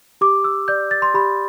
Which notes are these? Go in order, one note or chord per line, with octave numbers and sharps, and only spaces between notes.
G4 D6
E6
D5 G6
A6
C6
G4 B5